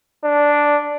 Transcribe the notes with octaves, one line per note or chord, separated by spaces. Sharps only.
D4